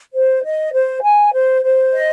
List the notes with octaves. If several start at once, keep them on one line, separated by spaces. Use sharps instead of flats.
C5
D#5
C5
G#5
C5
C5
D#5